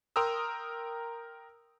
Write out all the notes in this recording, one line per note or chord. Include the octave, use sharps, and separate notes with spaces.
A#4 G5 A#5 C6 D#6 E6